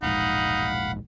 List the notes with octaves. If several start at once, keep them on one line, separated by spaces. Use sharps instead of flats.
E1 A#1 G#2 D#4 F5 F#5 B5